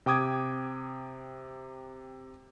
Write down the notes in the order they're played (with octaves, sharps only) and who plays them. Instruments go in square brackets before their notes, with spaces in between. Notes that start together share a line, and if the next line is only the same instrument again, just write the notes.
[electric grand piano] C3 G5 D6 D#6 G#6